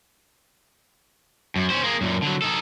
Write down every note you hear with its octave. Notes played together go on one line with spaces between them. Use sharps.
F#2
C#4 C5
A#3 G#4
F#2 A#2
D3 F#3
D#4 A4